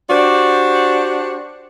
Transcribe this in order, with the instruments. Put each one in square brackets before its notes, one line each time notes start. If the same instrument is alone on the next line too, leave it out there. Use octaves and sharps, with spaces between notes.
[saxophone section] D4 F#4 G4 C5 D5